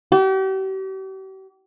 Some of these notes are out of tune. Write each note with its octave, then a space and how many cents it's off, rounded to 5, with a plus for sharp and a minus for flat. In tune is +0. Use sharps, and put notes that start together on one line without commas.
G4 -40